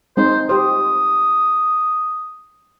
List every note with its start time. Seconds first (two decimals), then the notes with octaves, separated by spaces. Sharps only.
0.17 G#3 C4 D#4 C5
0.49 G4 C5 D#6